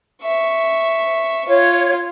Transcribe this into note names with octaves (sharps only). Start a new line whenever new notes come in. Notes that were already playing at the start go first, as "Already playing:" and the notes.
E5 C#6
F4 C#5